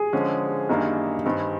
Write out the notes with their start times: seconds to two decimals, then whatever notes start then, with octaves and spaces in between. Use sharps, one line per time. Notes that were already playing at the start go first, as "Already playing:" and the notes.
Already playing: G#4
0.13 D3 F3 G#3 C#4
0.69 F#2 D#3 G3 A#3 D4
1.24 G2 D#3 G3 C4